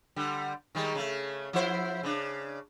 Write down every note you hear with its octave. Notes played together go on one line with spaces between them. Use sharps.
D3 G3
D#3 G3 G#3
C#3 A3
F3 E4 C5
C#3 D4